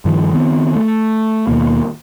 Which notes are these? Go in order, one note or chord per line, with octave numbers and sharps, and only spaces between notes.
G2 D#3 F3
D#3 B3 C4
A3
D#2 B2 A#3